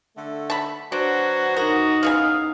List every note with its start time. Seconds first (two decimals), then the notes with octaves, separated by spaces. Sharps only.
0.16 D3 A3
0.50 A5 B5
0.92 F#3 D4 F#4 B4 C5
1.56 D#4 F#4 A#4
2.03 F#2 C#3 B3 E4 G#4 F5 G#5